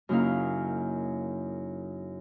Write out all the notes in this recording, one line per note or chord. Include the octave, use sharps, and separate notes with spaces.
F#2 C#3 A#3 D#4 E4 F5